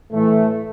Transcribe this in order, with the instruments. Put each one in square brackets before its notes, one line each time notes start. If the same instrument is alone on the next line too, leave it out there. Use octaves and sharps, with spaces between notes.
[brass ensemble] A2 E3 A3